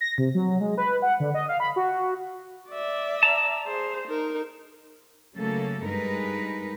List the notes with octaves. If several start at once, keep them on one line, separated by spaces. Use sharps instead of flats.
A#6
C3
F#3
G#3
B4
F#5
D3
D#5
F5
B5
F#4
D5 E5
A5 A#5
G#4 C5
D#4 A#4
C#3 F#3 A3 A#3 A4
G2 G#3 D#4 A#4 B4